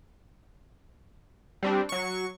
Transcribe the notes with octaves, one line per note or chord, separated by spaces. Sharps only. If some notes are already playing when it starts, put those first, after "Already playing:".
G3 C4 D4
F#3 C#6